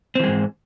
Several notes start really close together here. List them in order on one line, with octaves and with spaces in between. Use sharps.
C4 E3 G#3 G#2